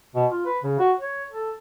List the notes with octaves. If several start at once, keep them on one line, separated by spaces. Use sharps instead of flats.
B2
F4
B4
C#3
F#4
C#5
A4